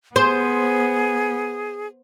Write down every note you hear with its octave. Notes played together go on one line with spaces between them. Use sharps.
B3 G#4 C5